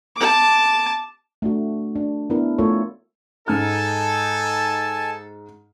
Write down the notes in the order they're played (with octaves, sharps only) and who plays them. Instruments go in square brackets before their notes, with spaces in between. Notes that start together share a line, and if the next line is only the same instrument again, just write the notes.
[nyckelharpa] A5 D6
[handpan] A3 D4 F#4
D4
B3 D4 E4 A#4
A3 F4 A4 A#4 C#5
[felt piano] G#2 F6 [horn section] D#4 A4 [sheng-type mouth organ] G#5 A5